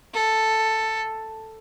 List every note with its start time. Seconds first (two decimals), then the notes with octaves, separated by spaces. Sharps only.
0.14 A4